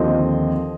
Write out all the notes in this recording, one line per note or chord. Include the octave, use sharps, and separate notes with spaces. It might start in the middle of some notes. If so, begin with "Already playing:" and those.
Already playing: D#2 D3 F3 C4 D#5